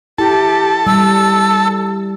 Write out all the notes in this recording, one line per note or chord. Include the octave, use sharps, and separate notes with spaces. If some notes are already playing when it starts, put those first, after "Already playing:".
E4 G4 A4 A5
G3 E6